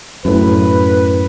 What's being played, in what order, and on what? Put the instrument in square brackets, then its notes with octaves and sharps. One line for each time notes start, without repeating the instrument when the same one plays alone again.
[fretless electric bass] F#2 A2 [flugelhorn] B4